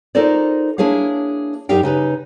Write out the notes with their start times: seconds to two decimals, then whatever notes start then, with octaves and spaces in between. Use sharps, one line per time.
0.15 D#4 F4 A4 A#4 C5 D5
0.78 A#3 D4 E4 G#4 C#5 F5
1.69 F#2 D#4 G4 E5 F5 G5
1.83 C#3 D#4 B4